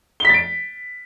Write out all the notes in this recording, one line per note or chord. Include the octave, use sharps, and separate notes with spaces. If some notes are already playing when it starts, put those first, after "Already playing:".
A6 B6 D7 G7